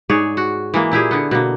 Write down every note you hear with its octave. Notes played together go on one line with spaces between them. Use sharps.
G#2 G#4 C#5 D5
F#4
E3 G#3 A#3
A#2 E4 G4 G#4
D3 B3
B2 D3 A#3